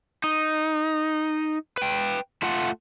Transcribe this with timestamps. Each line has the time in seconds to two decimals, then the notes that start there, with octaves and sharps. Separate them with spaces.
0.24 D#4
1.78 B4 G5
2.42 A3 F4 F#5